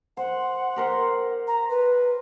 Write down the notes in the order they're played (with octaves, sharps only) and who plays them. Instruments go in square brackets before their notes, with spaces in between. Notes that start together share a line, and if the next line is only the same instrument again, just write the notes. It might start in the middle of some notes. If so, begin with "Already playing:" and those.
[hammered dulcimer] C5 [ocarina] F#5
[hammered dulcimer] G4 A#4 C5
[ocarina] A#5
B4